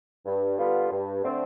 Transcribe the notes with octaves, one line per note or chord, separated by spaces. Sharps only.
G2
D3 G3 B3 F4
G2
D3 A3 C4